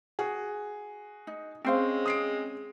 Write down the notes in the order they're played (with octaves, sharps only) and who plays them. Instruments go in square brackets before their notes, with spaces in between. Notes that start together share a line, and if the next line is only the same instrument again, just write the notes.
[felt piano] F#4 G#4
[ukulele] D#4
[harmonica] G#3 [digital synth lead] C4 [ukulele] C#4 C5 F5
[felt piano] D#6 C7 D7